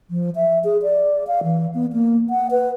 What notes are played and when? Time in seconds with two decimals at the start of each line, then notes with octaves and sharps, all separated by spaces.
0.11 F3
0.36 E5
0.64 G#4
0.83 D5
1.27 F5
1.44 E3
1.74 B3
1.93 A#3
2.30 F#5
2.51 B4